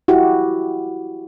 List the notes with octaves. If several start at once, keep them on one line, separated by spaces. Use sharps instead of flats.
E4 F#4 G4